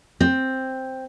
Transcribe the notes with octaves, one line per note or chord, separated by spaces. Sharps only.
C4